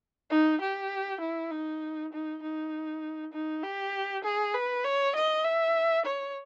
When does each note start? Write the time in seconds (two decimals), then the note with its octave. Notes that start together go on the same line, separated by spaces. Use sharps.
0.30 D#4
0.61 G4
1.21 E4
1.51 D#4
2.12 D#4
2.42 D#4
3.33 D#4
3.62 G4
4.24 G#4
4.54 B4
4.84 C#5
5.15 D#5
5.44 E5
6.05 C#5